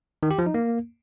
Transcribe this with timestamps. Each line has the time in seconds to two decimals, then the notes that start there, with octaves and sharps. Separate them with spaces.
0.23 D#3
0.31 G4
0.39 F3
0.46 D#4
0.54 A#3